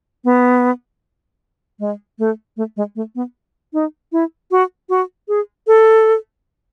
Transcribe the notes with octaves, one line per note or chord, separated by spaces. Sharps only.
B3
G#3
A3
A3
G#3
A3
B3
D#4
E4
F#4
F#4
G#4
A4